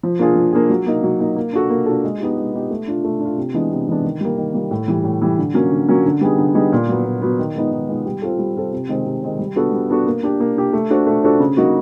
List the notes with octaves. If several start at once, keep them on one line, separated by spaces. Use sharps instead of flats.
F3
A#3 D4 F4 G#4
F3
A#3 D4 F4 G#4
F#3
A#3 D#4
F#3
A#3 D#4
A#3
D4 F#4 A4
A#3
D4 F#4 A4
G#3
B3 D#4 G4
G#3
B3 D#4 G4
A3
D4 F4
A3
D4 F4
C3
E3 G#3 B3 D4
C3
E3 G#3 B3 D4
D#3
G3 A#3
D#3
G3 A#3
A2
E3 G3
A2
E3 G3
D3
F#3 A#3 C#4
D3
F#3 A#3 C#4
D3
G3 B3 D#4 G#4
D3
G3 B3 D#4 G#4
A#2
F#3 B3
A#2
F#3 B3
D#3
G#3 B3 D#4
D#3
G#3 B3 D#4
G3
C4 F4 A4
G3
C4 F4 A4
C3
D#3 G#3 C4
C3
D#3 G#3 C4
G3
B3 D4 F#4 A4
G3
B3 D4 F#4 A4
A#3
D4 G4
A#3
D4 G4
A3
D4 F#4 A4 C5
A3
D4 F#4 A4 C5
C#3
F#3 A#3 D#4 F#4